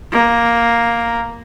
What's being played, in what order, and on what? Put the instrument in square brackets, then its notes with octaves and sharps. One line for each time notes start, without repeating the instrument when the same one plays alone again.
[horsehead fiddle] A#3